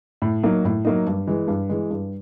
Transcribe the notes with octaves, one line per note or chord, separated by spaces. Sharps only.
A2
F#3 A#3 D#4
A2
F#3 A#3 D#4
G2
E3 G#3
G2
E3 G#3
G2